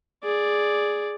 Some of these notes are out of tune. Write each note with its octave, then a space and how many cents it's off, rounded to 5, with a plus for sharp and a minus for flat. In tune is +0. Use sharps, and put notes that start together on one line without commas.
G#4 +0 D5 +0